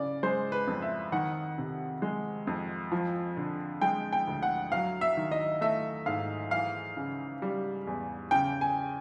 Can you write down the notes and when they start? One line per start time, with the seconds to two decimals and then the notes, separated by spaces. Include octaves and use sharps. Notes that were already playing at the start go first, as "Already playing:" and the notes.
Already playing: C#3 D5
0.23 G#3 C5
0.52 B4
0.67 F2
0.82 E5
1.12 D#3 F#5
1.58 C3
2.02 G#3
2.47 F2
2.92 F3
3.37 D3
3.81 G#3 G5
4.13 G5
4.27 D2
4.43 F#5
4.72 F#3 F5
5.01 E5
5.17 D#3
5.31 D#5
5.61 A3 E5
6.06 G#2 F5
6.51 E3 F5
6.97 C#3
7.42 G3
7.87 E2
8.31 C#3 G5
8.61 G#5